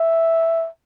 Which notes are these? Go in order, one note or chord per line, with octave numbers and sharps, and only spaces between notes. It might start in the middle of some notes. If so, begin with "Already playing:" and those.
Already playing: E5